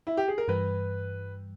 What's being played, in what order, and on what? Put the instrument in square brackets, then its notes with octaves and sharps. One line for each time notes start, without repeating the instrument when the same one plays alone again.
[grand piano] E4
G4
G#4
A#4
[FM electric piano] G2 E3 G3 [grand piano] B4